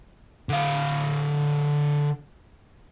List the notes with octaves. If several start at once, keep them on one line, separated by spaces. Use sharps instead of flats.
D3 F5